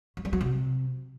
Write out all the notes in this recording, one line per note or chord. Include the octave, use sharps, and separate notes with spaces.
F#3
G3
F#3
C3